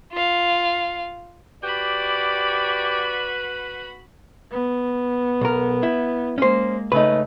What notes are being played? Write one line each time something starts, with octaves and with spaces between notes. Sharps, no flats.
F4 F5
F#4 G4 B4 D5 B5
B3
B1 A#4
E4
G#3 A#3 C#4 C5
C#3 A3 D#4 B4